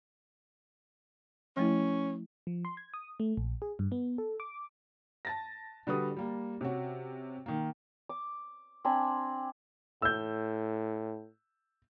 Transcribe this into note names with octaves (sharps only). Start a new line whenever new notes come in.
F3 A3 C#4 E4
F3
C6
G#6
D#6
A3
A#1
G#4
G2
B3
A4
D6
A5 A6 A#6
D3 G3 F#4 B4 D#6
G3 A#3
C3 C#4 F#4
D#3 A#3
D6
C4 D4 G#5 B5
A2 E6 G6